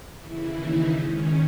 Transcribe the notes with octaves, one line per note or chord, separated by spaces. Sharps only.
D#2 C#3 E3 E4
D#4
G#2 D#3 C#4